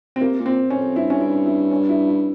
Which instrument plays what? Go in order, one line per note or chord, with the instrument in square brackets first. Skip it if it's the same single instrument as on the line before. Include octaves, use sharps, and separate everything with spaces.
[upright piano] C4
[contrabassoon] C3 [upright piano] A#3
[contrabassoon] A#2
[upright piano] C4
C#4
[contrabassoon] F2
[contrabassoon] G2 [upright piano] E4
[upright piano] C#4
E4
E4
C#4
E4
E4